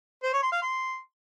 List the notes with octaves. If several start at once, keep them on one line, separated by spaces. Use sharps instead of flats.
C5
C#5
C6
F5
C6